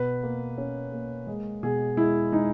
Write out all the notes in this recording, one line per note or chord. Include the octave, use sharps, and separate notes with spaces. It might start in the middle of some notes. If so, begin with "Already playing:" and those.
Already playing: B2 B4
A#3
C#4
A#3
G#3
B2 G#4
G#3 E4
G#3 D#4